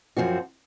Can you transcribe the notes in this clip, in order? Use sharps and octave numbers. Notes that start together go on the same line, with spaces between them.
F#2 F3 C4 F#4